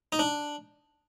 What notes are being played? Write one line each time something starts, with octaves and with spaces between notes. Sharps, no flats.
D#4
D4